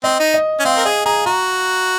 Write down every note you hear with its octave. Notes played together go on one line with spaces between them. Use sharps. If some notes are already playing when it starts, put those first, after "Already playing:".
C4 D#5
D#4
D#5
C#4
C4 F5
A#4
G#4 D#5
G#4 A#5
F#4 A#5